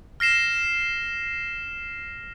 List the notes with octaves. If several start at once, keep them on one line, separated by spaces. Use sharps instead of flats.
F6 A#6 C7 E7